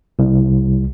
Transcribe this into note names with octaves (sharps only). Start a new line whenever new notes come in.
C2